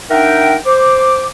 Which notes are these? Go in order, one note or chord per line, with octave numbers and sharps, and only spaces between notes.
D4 D#4 A#4 E5 F#5 G5
C5 D6